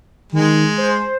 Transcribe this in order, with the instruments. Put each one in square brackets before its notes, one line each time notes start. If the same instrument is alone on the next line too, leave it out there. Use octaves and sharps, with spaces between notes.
[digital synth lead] D#3 [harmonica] G#3
[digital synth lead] C5